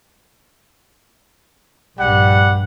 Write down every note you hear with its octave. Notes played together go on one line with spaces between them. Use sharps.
A#1 G2 G3 F#5